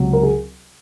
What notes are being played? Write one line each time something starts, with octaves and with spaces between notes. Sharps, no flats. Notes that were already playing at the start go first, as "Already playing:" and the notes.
Already playing: C#2 C3 F#3
A#4
G#4